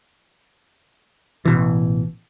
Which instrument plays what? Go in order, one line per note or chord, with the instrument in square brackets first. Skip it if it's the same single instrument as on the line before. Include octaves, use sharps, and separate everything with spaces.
[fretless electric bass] A1 B2 E3